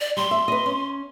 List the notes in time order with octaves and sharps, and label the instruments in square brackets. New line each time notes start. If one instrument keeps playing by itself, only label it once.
[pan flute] D5
[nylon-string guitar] G3 [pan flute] C6
[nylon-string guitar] E5
B4 D#5
C#4